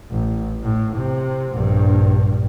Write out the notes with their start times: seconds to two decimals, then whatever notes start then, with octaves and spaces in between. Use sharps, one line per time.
0.11 A1
0.63 A2
0.97 C3
1.52 A#1 G2